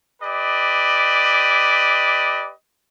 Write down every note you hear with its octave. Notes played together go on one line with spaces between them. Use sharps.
G4 B4 D5 D#5